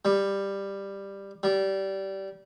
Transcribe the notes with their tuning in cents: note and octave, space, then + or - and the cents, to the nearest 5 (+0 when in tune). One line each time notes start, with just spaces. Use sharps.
G3 +10
G3 -20